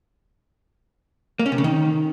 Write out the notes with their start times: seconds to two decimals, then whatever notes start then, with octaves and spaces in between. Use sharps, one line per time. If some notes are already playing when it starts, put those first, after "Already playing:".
1.39 A#3
1.46 C#4
1.52 C3
1.58 C#3
1.64 D#3